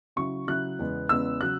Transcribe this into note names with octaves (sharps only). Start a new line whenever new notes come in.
C#3 F#3 E4 C#6
C#3 F#3 E4 F#6
E2 C#3 G#3 B3
E2 C#3 G#3 B3 E6
C#3 F#3 F#6